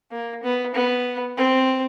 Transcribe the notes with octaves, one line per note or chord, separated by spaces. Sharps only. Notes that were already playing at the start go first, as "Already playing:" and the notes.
A#3
B3
B3
C4